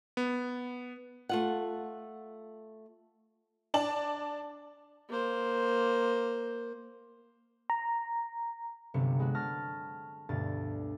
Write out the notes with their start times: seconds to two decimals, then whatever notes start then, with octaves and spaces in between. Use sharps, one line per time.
0.17 B3
1.29 A3 F4 F#5
3.74 D4 D5 A5 F#7
5.09 A#3 C5
7.70 A#5
8.94 G1 C3 F#3 B3 C#7
9.19 G#3 B3 F#4
9.35 A5 C#6 F6 A6 A#6
10.29 D2 G2 B2 A6